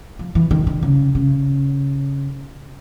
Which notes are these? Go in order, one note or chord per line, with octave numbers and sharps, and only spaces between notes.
F3
E3
D#3
D3
C#3
C#3